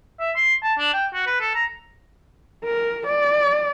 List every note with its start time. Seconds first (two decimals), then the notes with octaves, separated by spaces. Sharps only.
0.20 E5
0.36 C6
0.63 A5
0.79 D4
0.94 G5
1.14 F#4
1.27 B4
1.40 A4
1.55 A#5
2.65 A#4
3.07 D5